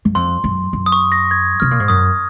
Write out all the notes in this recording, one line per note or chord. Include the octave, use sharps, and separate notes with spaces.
F#2
F2 C6
F#2
F#2
D#6
C#6
A#6
G#6
C3 F6
A#2
G#2
F#2 D#6